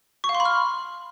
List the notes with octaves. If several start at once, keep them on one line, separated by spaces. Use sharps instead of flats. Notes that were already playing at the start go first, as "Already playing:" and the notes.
C#6
F5
C6
B5
F6